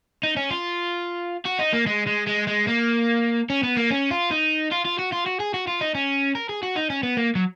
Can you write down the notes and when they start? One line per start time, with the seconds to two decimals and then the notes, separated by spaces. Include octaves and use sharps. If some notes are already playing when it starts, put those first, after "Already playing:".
0.23 D#4
0.37 C#4
0.51 F4
1.46 F#4
1.59 D#4
1.73 A#3
1.87 G#3
2.07 G#3
2.27 G#3
2.48 G#3
2.68 A#3
3.50 C#4
3.63 B3
3.77 A#3
3.90 C#4
4.11 F4
4.31 D#4
4.72 F4
4.85 F4
4.99 F#4
5.13 F4
5.26 F#4
5.40 G#4
5.54 F#4
5.67 F4
5.81 D#4
5.95 C#4
6.35 A#4
6.49 G#4
6.63 F#4
6.76 D#4
6.90 C#4
7.03 B3
7.17 A#3
7.35 F#3